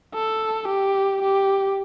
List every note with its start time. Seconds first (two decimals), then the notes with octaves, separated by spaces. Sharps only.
0.14 A4
0.68 G4
1.22 G4